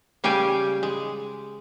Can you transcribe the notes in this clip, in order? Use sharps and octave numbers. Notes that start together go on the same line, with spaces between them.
C#3 G3 F5 G5 G#5
G#3